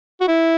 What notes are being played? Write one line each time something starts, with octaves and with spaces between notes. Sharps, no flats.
F#4
E4